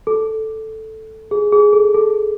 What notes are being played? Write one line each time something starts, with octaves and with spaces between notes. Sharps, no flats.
A4
G#4
G#4
A4
A4